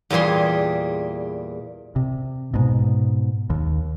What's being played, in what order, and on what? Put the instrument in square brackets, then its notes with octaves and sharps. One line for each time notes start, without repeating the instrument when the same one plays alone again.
[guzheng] E2 A#2 G3 G#4 C6
[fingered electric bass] C3
G#2 B2
D#2